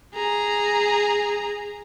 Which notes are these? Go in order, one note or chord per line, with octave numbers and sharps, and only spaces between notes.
G#4 A#5